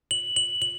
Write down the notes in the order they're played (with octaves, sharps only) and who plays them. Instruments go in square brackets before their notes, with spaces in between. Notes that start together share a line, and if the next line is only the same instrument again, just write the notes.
[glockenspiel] F#7
F#7
F#7